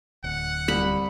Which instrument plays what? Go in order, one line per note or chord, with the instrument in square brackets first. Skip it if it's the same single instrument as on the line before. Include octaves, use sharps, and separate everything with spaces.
[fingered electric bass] D1 [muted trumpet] F#5
[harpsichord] C2 [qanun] B5